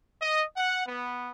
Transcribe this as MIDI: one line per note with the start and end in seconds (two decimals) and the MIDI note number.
0.21 0.44 75
0.56 0.85 78
0.86 1.29 59